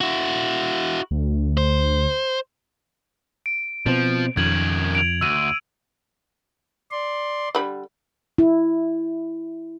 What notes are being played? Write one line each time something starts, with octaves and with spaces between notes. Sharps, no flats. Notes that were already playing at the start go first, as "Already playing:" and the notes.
E4 F#4
D2
C5
D7
B2 F3 C4
F2 D#3 C#4 G#6 F#7
D7 F7
D2 E6 D#7
D5 C6
D3 G3 B5
E4